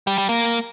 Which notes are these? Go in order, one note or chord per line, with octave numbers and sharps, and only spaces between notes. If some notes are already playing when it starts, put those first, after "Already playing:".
G3
G3
A#3